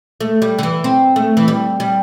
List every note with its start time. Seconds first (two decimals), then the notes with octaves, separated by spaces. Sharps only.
0.20 A3
0.42 G3
0.59 D3
0.63 E3
0.84 C4
1.16 A3
1.37 E3
1.48 G3
1.80 G3